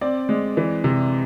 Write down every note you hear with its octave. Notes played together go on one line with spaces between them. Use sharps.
C4 D5
G#3
E3
C3